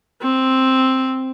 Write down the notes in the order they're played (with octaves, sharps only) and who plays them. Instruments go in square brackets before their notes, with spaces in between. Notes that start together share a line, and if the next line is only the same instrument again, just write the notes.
[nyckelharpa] C4